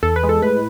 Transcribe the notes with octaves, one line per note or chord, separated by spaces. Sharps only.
E2 A4
B4
G#3
A4
A2 B4